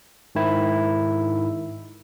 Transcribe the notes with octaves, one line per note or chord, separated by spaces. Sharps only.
G#2 D#3 E4